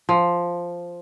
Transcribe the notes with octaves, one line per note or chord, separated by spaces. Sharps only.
F3